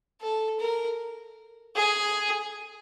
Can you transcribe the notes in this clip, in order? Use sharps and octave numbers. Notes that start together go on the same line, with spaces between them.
A4
A#4
G#4